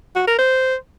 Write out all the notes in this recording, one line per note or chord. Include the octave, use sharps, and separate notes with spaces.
F#4
A#4
C5